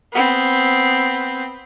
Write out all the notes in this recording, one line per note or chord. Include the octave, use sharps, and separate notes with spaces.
B3 C4